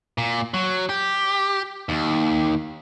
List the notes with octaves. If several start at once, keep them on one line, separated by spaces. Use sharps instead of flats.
A#2
F#3
G4
D#2